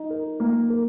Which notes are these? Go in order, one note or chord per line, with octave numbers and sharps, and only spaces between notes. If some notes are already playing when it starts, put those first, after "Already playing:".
Already playing: D#4
A#4
A#3
A#4